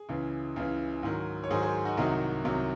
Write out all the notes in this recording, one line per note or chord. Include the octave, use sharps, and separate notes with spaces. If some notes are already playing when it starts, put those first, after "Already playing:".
Already playing: G#4
C#2 C#3 E3
C#2 C#3 E3
G#2 D#3 F#3
C#5
G#2 D#3 F#3 G#4 C5
G#4 C5
D#4 F#4
C2 C3 D#3 F#3 D#4 F#4
C2 C3 D#3 F#3